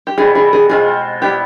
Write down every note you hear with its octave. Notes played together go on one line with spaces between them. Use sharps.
G4
B2 G3 C4 E4 G#4
G#4
G#4
B2 G#3 C4 F4 G#4
G3 B3 E4 G4